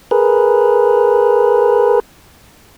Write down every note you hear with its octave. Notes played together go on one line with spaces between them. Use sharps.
G#4 A#4 B4